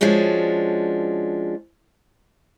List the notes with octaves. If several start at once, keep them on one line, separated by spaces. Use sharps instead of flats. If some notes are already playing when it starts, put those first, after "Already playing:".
F3 G#3 C#4 D4 F#4